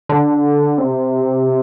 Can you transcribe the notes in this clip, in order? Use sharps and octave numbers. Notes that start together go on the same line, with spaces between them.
D3
C3